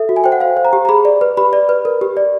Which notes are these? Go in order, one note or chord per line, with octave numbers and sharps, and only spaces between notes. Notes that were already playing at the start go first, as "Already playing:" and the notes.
Already playing: A4 E5
F#4
G#5
C5 G5
F#5
C5 F5
C5
A#5
G4
A#5
G#4 B5
D5
B4
G4 B5
D5
B4
A#4
G4
D5